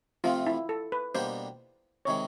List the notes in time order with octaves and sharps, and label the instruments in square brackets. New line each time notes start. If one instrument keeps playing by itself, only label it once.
[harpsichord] C3 F3 A3 C4 [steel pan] F4
[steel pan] E4
A4
B4
[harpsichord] B2 G3 A#3 D4 G4 [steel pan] C5
[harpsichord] C3 D#3 G#3 [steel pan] C#5